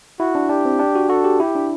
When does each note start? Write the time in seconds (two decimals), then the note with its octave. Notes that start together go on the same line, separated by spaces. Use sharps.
0.20 E4 F#4
0.35 D4
0.49 D4 G4
0.65 C4
0.79 D4
0.95 F#4
1.09 F#4 A4
1.24 G4
1.40 E4 G4
1.55 D4